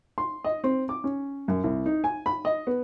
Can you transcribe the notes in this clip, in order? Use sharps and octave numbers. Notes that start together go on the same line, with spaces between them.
C6
D#5
C4
D6
C#4
F#2
C2
D#4
G#5
B5
D#5
B3